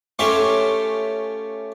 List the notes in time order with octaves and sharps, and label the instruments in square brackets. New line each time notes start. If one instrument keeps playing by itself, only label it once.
[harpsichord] A3 C#4 F4 G4 A4 E5